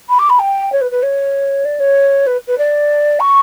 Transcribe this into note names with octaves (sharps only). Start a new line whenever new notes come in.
B5
D6
B5
G5
C#5
B4
B4
C#5
D5
C#5
B4
B4
D5
C#6